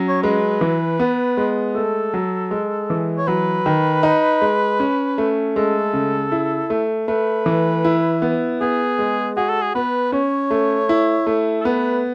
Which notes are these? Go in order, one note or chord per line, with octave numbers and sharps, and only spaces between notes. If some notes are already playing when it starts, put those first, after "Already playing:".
Already playing: F#3 C#4
C#5
G#3 B4
E3
B3
G#3
A3 A4
F#3
G#3
E3
C#5
F#3 B4
D#3
D#4
G#3
C#4
A3
G#3 A4
C#3
E4
A3
A3 B4
E3
E4
B3
B3 G#4
G#3
F#4 G#4
A4
G#4
B3 B4
C#4 C#5
A3
E4
A3
A4
B3 B4